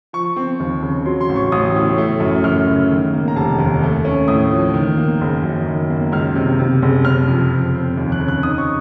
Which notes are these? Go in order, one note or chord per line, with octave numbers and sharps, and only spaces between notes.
F3 C#6
C4
D#2
C#3
F#3 C6
C6
A1
C#6
A1 D#6
A2
A3
F#2
F#2 F6
C#3
D#3
A#3
A#5
F1 A5
D#2
A3
C#4
A2 D#6
F3
D#3
A#3
F#1
F#2
D#3
A#3
C#2 F6
C3
C3
F#1
F#1 F6
F2
F3
C4
D#2
F#6
C#3
F#6
D#4 D#6
C#6